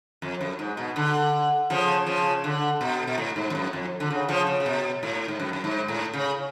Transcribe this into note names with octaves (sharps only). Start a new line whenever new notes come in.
F2
F#2
G#2
B2
D3
C#3 F3
C#3 F3
D3
B2
B2
A2
G#2
F2
F#2
F2
D3
C#3
C#3 F3
C#3
C#3
B2
A2
G#2
F#2
F#2
G#2
A2
C#3